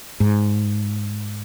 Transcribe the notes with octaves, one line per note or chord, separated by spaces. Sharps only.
G#2